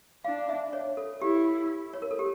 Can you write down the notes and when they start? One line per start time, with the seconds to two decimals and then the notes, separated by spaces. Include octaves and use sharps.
0.25 D4 F5
0.49 E5
0.73 C#5
0.97 A4
1.22 E4 G4
1.93 C#5
2.02 A#4
2.11 A4
2.19 G4